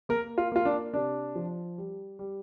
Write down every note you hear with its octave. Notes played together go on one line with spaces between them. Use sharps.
A#3 A#4
F4
A#3 F4
D4
C3 D4
F3
G3
G3